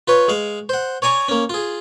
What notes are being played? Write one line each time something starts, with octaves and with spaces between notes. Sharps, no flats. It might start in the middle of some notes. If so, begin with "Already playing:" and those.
F4 B4 C#5
G#3 F5
C5 F#5
C#5 D5 G#5 A#5 C#6
A#3 C#4
F4 G#4